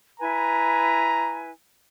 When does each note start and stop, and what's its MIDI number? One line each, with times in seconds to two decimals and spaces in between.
0.20 1.51 64
0.20 1.51 71
0.20 1.51 80
0.20 1.40 82